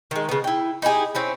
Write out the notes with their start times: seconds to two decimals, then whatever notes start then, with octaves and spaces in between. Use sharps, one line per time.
0.11 D#3 G#3
0.29 C#3 B3
0.44 E4 G5
0.82 D#4 E4 G4 G#4
1.15 C4 C#4 E4